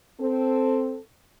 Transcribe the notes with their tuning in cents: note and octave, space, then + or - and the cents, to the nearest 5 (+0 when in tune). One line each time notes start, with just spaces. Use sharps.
C4 +0 A4 +0